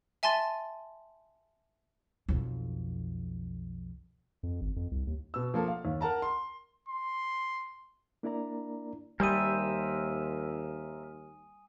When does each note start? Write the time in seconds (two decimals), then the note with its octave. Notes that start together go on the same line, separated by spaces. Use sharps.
0.23 E5 G#5 A5 C6 A6 D#7
2.29 B1 F2
4.43 F2
4.61 G#1
4.76 F2
4.91 C2
5.07 D#2
5.34 B2 E6
5.54 F3 A#3 A4
5.68 F5
5.85 D#2
6.01 A#4 F#5 A5 A#5
6.22 C6
6.89 C6
8.23 A#3 D4 E4 A#4 D5 A#5
9.20 D#2 G3 A#4 C5 E5 G#5 D#6 D#7